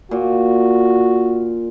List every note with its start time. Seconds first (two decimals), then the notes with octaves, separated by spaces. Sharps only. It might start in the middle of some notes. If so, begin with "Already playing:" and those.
0.11 A#2 F#4